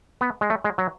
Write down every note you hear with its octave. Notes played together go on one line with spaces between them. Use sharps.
B3
G#3
A3
G#3
F#3